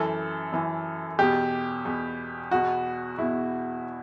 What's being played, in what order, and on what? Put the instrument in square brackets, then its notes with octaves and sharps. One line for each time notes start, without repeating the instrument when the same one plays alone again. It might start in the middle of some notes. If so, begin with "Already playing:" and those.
Already playing: [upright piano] F#2 E3 A4
F#2 E3
E2 B2 G4
E2 B2
E2 B2 F#4
E2 B2 E4